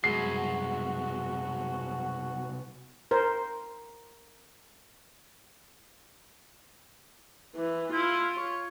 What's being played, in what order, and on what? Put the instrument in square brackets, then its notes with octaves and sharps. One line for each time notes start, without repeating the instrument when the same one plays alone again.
[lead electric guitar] C2 B2 [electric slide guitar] F#2 G3 G#3 [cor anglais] F#4 [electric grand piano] C7
[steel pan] A#4 C5
[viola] E3
[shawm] E4 [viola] F4
[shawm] C#5